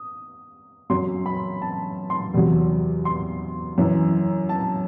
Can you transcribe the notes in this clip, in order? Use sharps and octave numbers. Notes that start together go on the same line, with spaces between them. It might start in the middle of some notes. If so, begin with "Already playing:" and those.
Already playing: D#6
F#2 F#3 C6
B5
A5
C6
E2 C3 F#3
C6
F#2 E3
A5